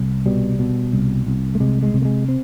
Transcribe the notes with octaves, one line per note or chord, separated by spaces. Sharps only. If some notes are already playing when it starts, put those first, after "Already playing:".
Already playing: C2
B2 G3
B2
C2
C2
A3
C3 G#3
G#3
C3
A3
G#3
C4